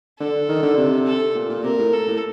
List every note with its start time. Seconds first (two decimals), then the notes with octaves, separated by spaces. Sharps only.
0.20 D3 A4
0.49 D#3
0.63 D3
0.77 C3
1.06 A4
1.35 A#2
1.50 A#2
1.64 C3 A#4
1.79 A2
1.93 A4
2.08 A2